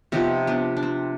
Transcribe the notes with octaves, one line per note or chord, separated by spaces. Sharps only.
C3 F3 B3 C4 D#4
B3 D4
D4
C4